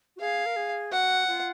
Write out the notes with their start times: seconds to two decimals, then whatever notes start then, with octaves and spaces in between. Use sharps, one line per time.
0.16 F#4
0.20 G#4 F5
0.46 A#4
0.56 G#4
0.92 F#4 F#5
1.28 F4